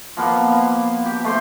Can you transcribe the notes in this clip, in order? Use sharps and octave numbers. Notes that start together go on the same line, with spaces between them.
F3 A#3 B3
G4
A3 C5 C6